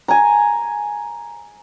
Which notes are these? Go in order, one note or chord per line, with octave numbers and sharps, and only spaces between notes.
G#5 A#5